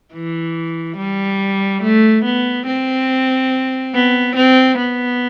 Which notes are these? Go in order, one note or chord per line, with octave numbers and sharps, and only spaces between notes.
E3
G3
A3
B3
C4
B3
C4
B3